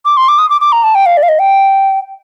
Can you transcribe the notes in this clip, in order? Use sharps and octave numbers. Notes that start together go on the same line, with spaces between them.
D6
C6
D6
D#6
D6
D6
A#5
A5
G5
F5
D5
F5
D#5
G5